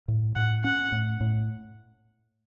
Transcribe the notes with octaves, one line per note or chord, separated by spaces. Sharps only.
A2
A2 F#5
C#4 F#5
A2
A2